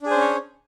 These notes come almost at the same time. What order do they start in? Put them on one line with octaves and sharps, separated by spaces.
D4 G#4 C5 C#4 C#5